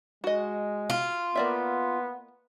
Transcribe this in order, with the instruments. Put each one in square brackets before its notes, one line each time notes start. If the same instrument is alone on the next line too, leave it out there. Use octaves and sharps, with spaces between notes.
[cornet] G#3 [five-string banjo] F#4 D#5
[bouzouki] F4
[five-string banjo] A#3 D5 E5 [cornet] B3